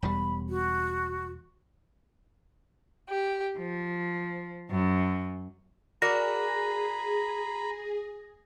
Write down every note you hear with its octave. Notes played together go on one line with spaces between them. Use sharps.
E1 E2 G3 B5
F#4
G4
F3
F#2
F#4 G#4 A#4 D5 A#5 B5 A#6